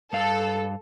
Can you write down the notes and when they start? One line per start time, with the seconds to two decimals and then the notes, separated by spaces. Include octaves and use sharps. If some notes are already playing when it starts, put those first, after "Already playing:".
0.13 G2 A4 F5